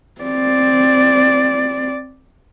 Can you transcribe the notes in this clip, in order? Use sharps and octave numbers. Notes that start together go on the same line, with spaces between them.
C4 D5